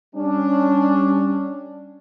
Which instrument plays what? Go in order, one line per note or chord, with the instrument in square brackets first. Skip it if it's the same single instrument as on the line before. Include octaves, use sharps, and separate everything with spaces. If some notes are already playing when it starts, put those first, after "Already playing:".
[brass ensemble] G3 C#4 D4